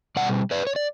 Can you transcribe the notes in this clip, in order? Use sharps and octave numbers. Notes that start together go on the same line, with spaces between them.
B2 G3 D5 F#5
B4 D5
C#5
D5